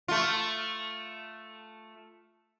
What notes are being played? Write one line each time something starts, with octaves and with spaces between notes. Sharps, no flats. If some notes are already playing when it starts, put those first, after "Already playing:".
A3 F4